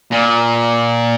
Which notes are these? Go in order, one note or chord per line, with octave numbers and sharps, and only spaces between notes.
A#2